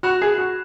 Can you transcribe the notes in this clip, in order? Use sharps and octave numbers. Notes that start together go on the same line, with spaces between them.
F#4 B5 F#6 E7
G#4
F#4